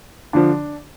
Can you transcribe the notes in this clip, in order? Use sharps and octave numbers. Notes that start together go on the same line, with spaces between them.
D3 F3 D4